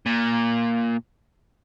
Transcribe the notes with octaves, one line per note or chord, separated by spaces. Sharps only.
A#2